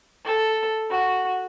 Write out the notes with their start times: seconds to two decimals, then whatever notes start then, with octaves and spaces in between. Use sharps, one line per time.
0.25 A4
0.90 F#4